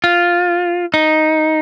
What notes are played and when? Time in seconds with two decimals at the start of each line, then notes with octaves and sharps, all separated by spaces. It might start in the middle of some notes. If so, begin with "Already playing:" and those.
0.04 F4
0.94 D#4